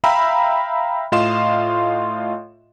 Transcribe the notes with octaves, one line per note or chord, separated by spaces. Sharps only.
E5 F5 G5 A#5 B5 E6
A2 F4 D#5 F5 C6 E7